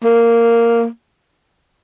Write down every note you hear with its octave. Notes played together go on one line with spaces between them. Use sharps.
A#3